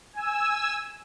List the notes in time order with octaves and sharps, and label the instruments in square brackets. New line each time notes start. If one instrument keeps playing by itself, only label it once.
[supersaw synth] G#5 E6